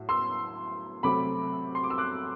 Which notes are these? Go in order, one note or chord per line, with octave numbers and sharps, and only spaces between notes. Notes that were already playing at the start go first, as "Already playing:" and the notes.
Already playing: A2 F#3
C6 E6
C3 F#3 A3 C4 B5 D6
C6
D6
E6
D6 F#6